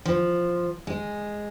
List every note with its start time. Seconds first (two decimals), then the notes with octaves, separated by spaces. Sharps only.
0.05 F3
0.87 G#3